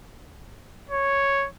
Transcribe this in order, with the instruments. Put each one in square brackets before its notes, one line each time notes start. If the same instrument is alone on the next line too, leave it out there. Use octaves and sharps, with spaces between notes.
[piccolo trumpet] C#5